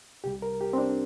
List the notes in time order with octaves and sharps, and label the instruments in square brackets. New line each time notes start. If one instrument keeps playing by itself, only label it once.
[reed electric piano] C2 C3 G3 G4
A#4
G4
C4
D4